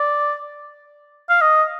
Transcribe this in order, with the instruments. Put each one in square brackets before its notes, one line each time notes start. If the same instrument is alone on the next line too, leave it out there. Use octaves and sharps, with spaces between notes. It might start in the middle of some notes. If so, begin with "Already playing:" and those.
Already playing: [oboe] D5
F5
D#5